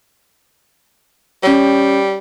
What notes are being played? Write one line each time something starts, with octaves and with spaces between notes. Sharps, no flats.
G3 C#4 C#5